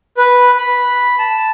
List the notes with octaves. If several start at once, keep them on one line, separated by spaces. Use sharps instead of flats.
B4
B5
A5